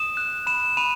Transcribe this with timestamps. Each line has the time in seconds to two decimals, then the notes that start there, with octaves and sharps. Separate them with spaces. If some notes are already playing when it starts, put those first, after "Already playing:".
Already playing: D#6 E7
0.17 F#6
0.47 B5 E7
0.77 B5 D#7